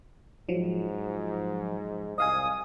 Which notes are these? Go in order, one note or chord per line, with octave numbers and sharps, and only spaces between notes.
G#2 F3 F#3
C2 D#5 F5 G#5 D#6